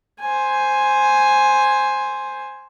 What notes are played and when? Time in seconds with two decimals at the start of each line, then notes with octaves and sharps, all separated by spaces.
0.21 C5 G#5